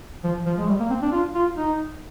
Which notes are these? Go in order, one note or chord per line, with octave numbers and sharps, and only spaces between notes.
F3
F3
G#3
G3
A#3
C4
D4
F4
F4
D#4